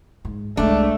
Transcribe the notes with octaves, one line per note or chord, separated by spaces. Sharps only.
G#2
C2 G#3 A3 D4